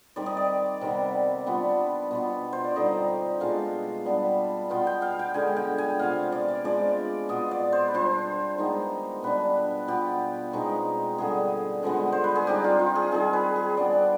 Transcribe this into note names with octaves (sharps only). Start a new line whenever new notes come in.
D#3 G3 C4 D5
D#5
D5
C3 D#3 G3 B3
G3 B3 D4 F4
B2 B3 F4
C5
D5
D3 G3 C4 D#4 D#5
B2 G#3 D4 F4 F5
G3 B3 D4
B2 B3 F4 G5
G5
F5
G5
D3 G#3 B3 G#5
G5
G#5
C3 F3 B3 F5
D5
D5
F3 G#3 D4 D5
B2 B3 F4 D#5
D5
C5
B4
G3 D4 F4 C5
D#3 G#3 B3 D#4
B2 G3 D4 B4
B2 B3 F4 G4
B2 G#3 C4 D#4
D3 G3 B3 G#4
D3 F3 G#3 B3
C5
B4
G#4
G3 C4 D#4 G4
F4
F4
G#4
D#3 G3 C4 F4 G#4
B4
G#4
G3 B3 D4 D5